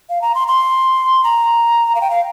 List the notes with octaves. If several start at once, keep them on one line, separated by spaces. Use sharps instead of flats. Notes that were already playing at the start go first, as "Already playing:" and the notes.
F5
A#5
C6
C6
A#5
F5
G5
F5